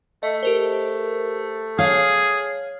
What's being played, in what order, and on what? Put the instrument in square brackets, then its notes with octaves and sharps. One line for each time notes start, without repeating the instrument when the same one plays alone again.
[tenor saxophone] A3 [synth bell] D#5
[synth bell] G4 A#4 C5
[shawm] G#4 [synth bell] C#5 F6 [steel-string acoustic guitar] F5